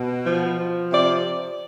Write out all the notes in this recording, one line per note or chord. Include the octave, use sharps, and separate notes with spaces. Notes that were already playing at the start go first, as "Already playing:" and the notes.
Already playing: B2
F3
F3
C3 D5